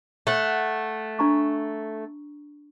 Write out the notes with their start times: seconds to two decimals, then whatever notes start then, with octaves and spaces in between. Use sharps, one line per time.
0.27 A3 F#5
1.19 D4 A#5 C#6